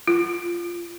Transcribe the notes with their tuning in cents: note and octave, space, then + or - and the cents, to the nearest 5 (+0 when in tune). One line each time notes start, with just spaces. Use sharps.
F4 -15